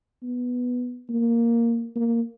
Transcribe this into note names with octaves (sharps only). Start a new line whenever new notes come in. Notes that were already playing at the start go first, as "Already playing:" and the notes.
B3
A#3
A#3